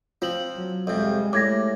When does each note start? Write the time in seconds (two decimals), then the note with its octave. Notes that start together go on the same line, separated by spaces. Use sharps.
0.22 F3 C4 F4 F#7
0.56 F#3
0.87 F2 C3 G3 G#3
1.33 A2 D6 G#6 A#6